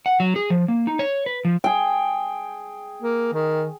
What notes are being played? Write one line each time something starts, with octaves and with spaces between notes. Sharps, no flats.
F#5
F#3
G#4
F3
A#3
D#4
C#5
B4
F3
G#4 G5
A#3
D#3